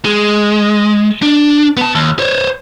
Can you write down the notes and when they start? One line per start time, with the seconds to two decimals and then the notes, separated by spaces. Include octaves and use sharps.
0.05 G#3
1.22 D4
1.77 B3 A5
1.95 D#2
2.19 C5 C#5